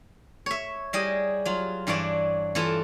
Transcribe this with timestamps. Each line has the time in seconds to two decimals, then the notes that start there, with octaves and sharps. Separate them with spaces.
0.46 C#5 E5
0.93 G3 E4 G#4 D#5
1.45 F#3 F4
1.87 G2 E3 D4 C#5 D5 A5
2.55 E3 E4 F4 A4